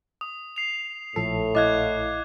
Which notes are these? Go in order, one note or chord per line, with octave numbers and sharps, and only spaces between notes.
D#6
C7 F7
A#1 A2 F3 A4 C7
A#1 E4 D#5 F5 D6 F#6 G#6